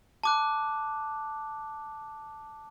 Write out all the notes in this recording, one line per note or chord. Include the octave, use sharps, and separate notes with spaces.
A5 D6 F#6